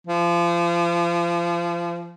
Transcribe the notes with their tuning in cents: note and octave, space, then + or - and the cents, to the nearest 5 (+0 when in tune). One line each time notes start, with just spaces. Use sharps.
F3 -30